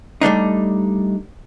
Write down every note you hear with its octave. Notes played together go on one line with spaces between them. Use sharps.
G3 A3 D4 D#4